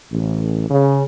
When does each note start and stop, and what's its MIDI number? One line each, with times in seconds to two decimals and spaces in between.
0.10 0.65 33
0.70 1.03 49